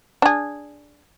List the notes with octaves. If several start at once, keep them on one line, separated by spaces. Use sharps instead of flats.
D4 G#4